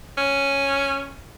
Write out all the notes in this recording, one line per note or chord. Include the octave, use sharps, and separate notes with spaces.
C#4